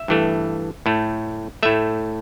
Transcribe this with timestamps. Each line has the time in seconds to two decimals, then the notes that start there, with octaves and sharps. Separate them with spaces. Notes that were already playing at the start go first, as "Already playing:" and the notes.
Already playing: E5
0.08 G2 E3 A3
0.86 A2 A3
1.63 A2 A3 E5